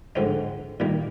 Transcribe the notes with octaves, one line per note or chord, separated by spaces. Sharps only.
G#2 D3 F3 C4 D#4
A#2 D#3 G3 A#3